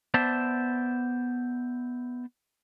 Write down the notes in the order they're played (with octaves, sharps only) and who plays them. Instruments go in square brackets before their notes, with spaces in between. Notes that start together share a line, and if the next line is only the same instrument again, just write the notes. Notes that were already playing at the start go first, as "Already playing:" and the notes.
[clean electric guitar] B3 C5 D5 E5 A5